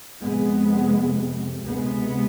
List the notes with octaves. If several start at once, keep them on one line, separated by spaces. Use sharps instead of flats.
F2 C3 G#3 B3
D2 C3 G#3 B3